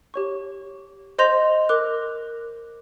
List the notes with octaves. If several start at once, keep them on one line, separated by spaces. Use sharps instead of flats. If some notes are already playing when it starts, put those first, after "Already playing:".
G4 C#5 C#6
C5 D#5 C6 G6 A#6 F7
A#4 D6 F#6